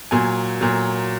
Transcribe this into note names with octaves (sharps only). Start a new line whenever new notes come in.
A#2 F#3 G#5
A#2 F#3